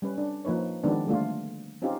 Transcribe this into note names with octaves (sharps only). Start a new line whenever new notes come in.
G3 C#4 B4
D4
F3 A#3 D#4 B4 C#5
D#3 F3 G#3 B3 C4 D4
D3 G3 A3 A#3 D4 F4
C4 C#4 D#4 F4 G4